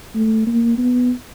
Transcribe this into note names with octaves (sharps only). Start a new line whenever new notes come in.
A3
A#3
B3